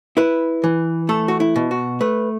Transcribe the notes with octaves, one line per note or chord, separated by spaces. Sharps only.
E4 B4
E3
A3 A4
F#4
E4
B2
F#4
A3 B4